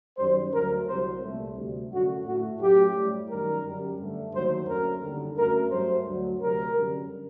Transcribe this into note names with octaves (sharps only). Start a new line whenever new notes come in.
F#2 D#3 G3 C5
D2 D3 F#3 A3 A#4
C2 C3 F#3 C5
C2 A#2 A3
D2 C3 G3
F#2 D3 F#3 A3 F#4
A2 A3 F#4
F#2 F#3 A3 G4
A2 G3
F#2 D#3 G3 A#4
F#2 D3 G3
G2 D3 A3
D#2 D3 F#3 A3 C5
F#2 F#3 A3 A#4
D#2 D3 G3
F#2 F#3 A3 A#4
G2 F#3 A3 C5
D2 D3 F#3
D2 C3 F#3 A#4
F#2 D3 G3